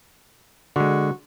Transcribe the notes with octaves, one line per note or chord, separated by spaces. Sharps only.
D3 G#3 F#4